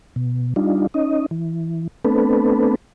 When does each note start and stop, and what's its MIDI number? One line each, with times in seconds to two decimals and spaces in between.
0.16 0.54 47
0.56 0.87 55
0.56 0.87 62
0.56 0.87 63
0.56 0.87 65
0.94 1.26 61
0.94 1.26 63
0.94 1.26 75
1.31 1.88 52
2.05 2.75 57
2.05 2.75 59
2.05 2.75 60
2.05 2.75 62
2.05 2.75 69
2.05 2.75 71